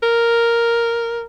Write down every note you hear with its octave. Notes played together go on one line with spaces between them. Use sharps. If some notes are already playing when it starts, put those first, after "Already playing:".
A#4